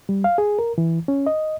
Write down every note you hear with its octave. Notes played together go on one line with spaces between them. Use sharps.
G3
F5
G#4
A#4
E3
C#4
D#5